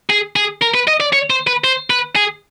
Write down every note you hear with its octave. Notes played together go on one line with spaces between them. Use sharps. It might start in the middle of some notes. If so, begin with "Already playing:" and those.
G#4
G#4
A#4
B4
D#5
D5
C#5
C5
B4
C5
B4
G#4